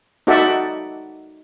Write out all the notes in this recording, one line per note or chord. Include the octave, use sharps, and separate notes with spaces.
D#4 F#4 A4 D5 E5 F#5